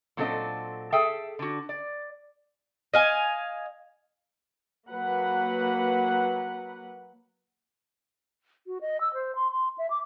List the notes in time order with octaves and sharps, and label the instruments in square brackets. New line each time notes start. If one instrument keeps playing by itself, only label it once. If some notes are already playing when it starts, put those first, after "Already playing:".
[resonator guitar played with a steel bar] A#2 F#3 C4 D4 A4 D#5
G#4 A4 E5 G5
D3 F#4
D5
[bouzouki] D#5 F5 G#5
[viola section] F#3 A#3 B4 F#5
[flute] F#4
D#5
E6
C5
C6
C6
E5
D6